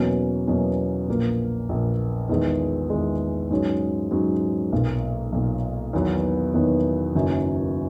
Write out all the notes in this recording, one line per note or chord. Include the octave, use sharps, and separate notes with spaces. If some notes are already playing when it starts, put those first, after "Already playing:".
Already playing: E2 B2 F#3 A#3 C#4
E2 B2 F#3 A#3 C#4
A#1 A#2 A#3
A#1 A#2 A#3
E2 D#3 G#3
E2 D#3 G#3
G#2 F#3 C#4
G#2 F#3 C#4
B1 A#2 A#3
B1 A#2 A#3
E2 D#3 F#3 B3 F#4
E2 D#3 F#3 B3 F#4
F#1 F#2 D#3 F#3